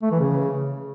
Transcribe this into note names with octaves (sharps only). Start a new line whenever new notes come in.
A3
E3
C#3